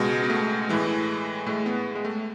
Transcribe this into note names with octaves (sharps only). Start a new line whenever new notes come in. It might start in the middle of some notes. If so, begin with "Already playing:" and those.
Already playing: C#2 B2 G#3
B3
A3
A2 E3 G#3
A2 G#3 A3
B3
G#3
A3